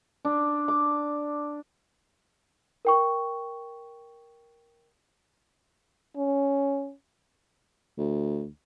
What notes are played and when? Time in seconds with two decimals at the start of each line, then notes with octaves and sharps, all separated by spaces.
0.25 D4
0.68 D6
2.85 A#4 G5 C#6
6.17 C#4
7.97 D2